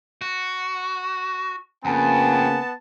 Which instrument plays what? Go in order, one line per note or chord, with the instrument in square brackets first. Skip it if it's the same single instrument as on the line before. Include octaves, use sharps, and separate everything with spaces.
[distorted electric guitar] F#4
[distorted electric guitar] F2 [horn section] C#3 A#3 G#5 [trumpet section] B3 A5